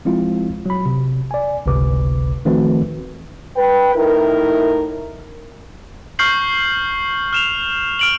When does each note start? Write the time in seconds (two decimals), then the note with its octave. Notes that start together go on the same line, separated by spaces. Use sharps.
0.05 F3 G#3 C4 E4 F4
0.66 F#3 B5
0.86 C3
1.31 D5 G#5
1.66 G1 C#2 C3 B4 D6
2.45 D#3 F3 A3 C4 F#4 B4
3.56 B4 G5
3.95 A2 D#4 E4 A#4
6.19 C#6 F6 G6 C7 F#7
7.33 F6 E7 F7
7.99 F6 D7 F#7